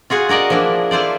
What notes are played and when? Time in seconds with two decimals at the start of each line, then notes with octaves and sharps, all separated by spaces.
0.10 F4 F#4 G#4 F#5
0.29 F#4 A#4 D5 D#5
0.50 F3 A#3 D4 E4
0.91 E4 F4 C5 D5